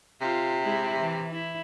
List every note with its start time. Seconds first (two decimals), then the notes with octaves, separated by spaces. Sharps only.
0.21 C3 F4
0.62 G#3 E4
0.98 E3
1.31 E4